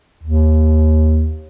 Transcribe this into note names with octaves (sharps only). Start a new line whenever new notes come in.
D#2